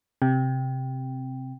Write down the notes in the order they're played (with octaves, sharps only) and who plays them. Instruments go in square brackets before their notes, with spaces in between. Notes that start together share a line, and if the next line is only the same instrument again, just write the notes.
[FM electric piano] C3